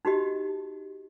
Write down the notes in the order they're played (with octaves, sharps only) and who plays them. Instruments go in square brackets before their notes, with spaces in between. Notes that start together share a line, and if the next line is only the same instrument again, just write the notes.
[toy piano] D#4 F#4 G4 D#5